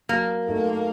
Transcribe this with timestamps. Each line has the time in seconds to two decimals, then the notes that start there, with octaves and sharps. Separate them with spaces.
0.09 F#3 A#3
0.47 A3 D#4 A4